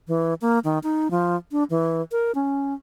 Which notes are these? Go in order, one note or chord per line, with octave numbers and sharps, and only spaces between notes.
E3
A#3
D#3
D#4
F3
D4
E3
A#4
C#4